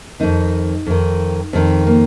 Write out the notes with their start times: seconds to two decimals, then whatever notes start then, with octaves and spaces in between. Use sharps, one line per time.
0.20 F2 D#3 D#4
0.86 F2 D#3
1.53 F2 D#3 C4
1.87 A#3